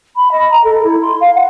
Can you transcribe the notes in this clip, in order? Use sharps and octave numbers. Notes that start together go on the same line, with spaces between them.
B5
D#5
A#5
A4
E4
C6
F5
F#5